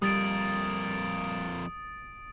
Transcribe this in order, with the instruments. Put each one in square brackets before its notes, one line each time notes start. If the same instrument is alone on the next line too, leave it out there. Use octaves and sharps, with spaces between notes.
[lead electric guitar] F2 A#3 [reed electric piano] G3 [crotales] D#6 A6 D7